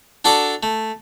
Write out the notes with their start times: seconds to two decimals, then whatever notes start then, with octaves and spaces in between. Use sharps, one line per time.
0.25 D4 F#4 A4 D5 A#5
0.63 A3